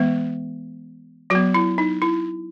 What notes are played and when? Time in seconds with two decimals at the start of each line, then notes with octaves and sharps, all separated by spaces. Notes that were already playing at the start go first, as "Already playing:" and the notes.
Already playing: E3 G#3 B3
1.30 F#3 F#4
1.35 B3
1.54 E4
1.78 D#4
2.02 E4